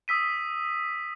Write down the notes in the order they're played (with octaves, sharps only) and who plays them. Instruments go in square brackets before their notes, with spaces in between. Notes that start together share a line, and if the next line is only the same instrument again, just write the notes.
[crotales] D#6 E6 B6 D#7